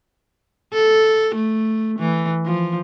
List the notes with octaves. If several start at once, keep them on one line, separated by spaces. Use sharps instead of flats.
A4
A3
E3
F3